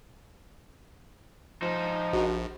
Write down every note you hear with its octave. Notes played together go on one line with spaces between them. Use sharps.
F3 D#4 C5
A#1 F#4 A#4